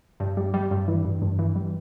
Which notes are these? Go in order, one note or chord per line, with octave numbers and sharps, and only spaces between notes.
G2
G3
G3
G2
E3
G2
G2
E3
G3